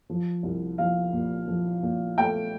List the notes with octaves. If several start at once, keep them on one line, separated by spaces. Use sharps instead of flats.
F3
C2
F3 F5
A#2
F3
A#2
A3 G5